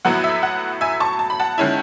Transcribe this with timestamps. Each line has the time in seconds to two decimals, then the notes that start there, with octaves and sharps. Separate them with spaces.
0.05 A2 F#3 B3 E4 F#5
0.24 E5
0.43 F#5
0.81 E5 G#5
1.00 A5 C#6
1.19 A5
1.30 B5
1.40 F#5 A5
1.58 D#3 G#3 C#4 E4